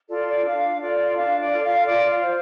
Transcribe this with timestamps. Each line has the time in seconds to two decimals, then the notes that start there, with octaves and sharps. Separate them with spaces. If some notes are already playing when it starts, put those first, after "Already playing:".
0.09 F4 A4 D5
0.27 D5
0.44 D4 F5
0.80 F4 A4 D5
1.16 D4 F5
1.39 D5
1.51 F4 A4
1.63 F5
1.86 F4 D5
2.10 F5
2.21 C5